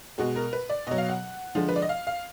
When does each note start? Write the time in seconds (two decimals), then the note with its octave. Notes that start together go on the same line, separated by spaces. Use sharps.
0.18 B2 G#3 F#4
0.36 A#4
0.53 B4
0.70 D5
0.87 B2 F#3 D#5
0.98 F5
1.09 F#5
1.55 D3 F3 G#3
1.68 B4
1.76 D5
1.82 D#5
1.89 F5
2.07 F5